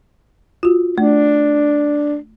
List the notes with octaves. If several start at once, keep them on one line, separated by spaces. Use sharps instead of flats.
F4 F#4
A3 D4